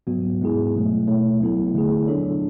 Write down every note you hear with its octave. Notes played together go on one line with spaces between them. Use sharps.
G#2 F#3 B3 F#4
G#2 G#3 B3 E4 G#4
B2 F#3 A3
B2 A3 E4 A4 C#5
F#3 B3 E4 A4
D3 A3 E4 G#4
F#3 B3 D4 A4 C#5